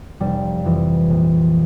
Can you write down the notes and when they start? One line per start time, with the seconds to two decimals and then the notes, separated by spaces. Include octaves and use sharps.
0.20 F1 G3
0.65 F2 E3
1.09 A#1